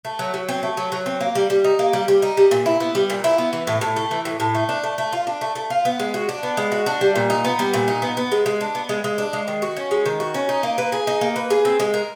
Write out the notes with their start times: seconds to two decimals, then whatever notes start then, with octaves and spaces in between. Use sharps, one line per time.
0.05 A3
0.19 F#3
0.34 F#3
0.49 C4
0.63 A3
0.77 F#3
0.92 F#3
1.06 C4
1.21 A#3
1.35 G3
1.50 G3
1.64 D#4
1.79 A#3
1.93 G3
2.08 G3
2.22 D#4
2.37 G3
2.51 A#2
2.66 E4
2.80 B3
2.95 G3
3.10 A#2
3.24 E4
3.38 B3
3.53 E3
3.67 A2
3.81 A2
3.96 A3
4.11 E3
4.25 A2
4.40 A2
4.55 A3
4.69 D4
4.83 A3
4.98 A3
5.13 F4
5.27 D4
5.41 A3
5.55 A3
5.70 F4
5.85 B3
6.00 G#3
6.14 F#4
6.29 D4
6.43 B3
6.57 G#3
6.72 F#4
6.86 D4
7.01 G3
7.15 A#2
7.30 D#4
7.45 B3
7.59 G3
7.74 A#2
7.88 D#4
8.02 B3
8.17 B3
8.32 G#3
8.46 G#3
8.61 D4
8.75 B3
8.89 G#3
9.04 G#3
9.18 D4
9.33 G#3
9.48 D#3
9.62 F#4
9.77 C#4
9.91 G#3
10.06 D#3
10.20 F#4
10.34 C#4
10.49 D#4
10.63 A#3
10.78 B4
10.92 G#4
11.07 D#4
11.21 A#3
11.36 B4
11.50 G#4
11.65 C4
11.80 G#3
11.94 A#4